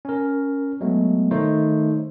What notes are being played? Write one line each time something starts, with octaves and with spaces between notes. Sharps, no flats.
C#4 A#4
F#3 G#3 A3 B3
D#3 A3 D#4 C5 C#5